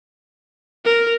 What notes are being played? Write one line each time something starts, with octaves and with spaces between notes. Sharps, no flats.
A#4